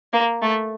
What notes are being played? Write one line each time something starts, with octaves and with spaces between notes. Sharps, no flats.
A#3
A3